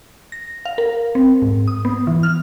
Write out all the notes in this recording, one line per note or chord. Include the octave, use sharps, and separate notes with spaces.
A#6
F5
A#4
C4
G#2
D#6
B3
E3
F6